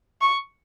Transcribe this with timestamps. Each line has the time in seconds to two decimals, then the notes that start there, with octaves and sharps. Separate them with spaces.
0.21 C#6